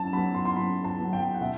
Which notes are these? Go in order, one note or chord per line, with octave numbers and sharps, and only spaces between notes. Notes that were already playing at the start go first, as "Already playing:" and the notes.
Already playing: F#2 A5
F#3 B3 B5
C6
C6
F#2 B5
A5
F#3 B3
G5
F#5
B2 E5